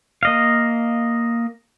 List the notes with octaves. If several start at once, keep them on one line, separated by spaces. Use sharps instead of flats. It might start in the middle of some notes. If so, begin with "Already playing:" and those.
A#3 D#5 F5